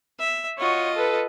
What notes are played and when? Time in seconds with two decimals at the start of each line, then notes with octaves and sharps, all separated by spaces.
0.19 E5
0.58 F4 F#4 C#5 D#5
0.95 A4 B4